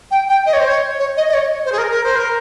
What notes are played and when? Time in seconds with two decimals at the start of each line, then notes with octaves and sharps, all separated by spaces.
0.11 G5
0.29 G5
0.46 D#5
0.53 C#5
0.60 C5
0.68 C#5
0.99 C#5
1.17 D#5
1.29 D#5
1.34 C#5
1.65 C5
1.72 G#4
1.78 A#4
1.91 A#4
2.04 C5
2.16 A#4